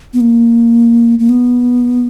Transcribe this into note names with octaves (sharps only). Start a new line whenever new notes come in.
B3
A#3
A#3
B3